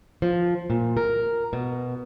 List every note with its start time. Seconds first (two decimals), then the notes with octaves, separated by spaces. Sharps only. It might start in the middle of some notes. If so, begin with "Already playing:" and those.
0.22 F3
0.70 A#2
0.97 A#4
1.53 B2